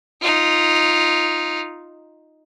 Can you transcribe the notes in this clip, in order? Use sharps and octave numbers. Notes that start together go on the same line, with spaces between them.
D#4 F4